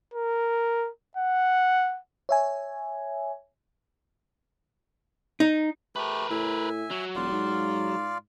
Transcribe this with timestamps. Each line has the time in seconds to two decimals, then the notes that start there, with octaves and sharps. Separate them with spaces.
0.14 A#4
1.17 F#5
2.29 C#5 E5 G#5
5.40 D#4
5.96 A3 G4 A#4 B4
6.31 A2 E5 G#5
6.91 F#3
7.15 E1 F4 D5 F5
7.32 G#2